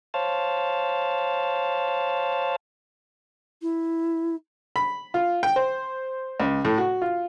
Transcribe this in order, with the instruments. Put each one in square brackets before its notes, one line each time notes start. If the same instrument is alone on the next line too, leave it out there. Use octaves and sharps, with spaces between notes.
[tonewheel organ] C5 C#5 F5 A5
[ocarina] E4
[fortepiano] B5
F4
G5
C5
C#2
A2
F#4
F4